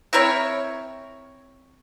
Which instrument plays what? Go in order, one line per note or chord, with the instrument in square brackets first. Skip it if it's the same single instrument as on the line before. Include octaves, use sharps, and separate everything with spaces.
[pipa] C4 E4 A#4 C#5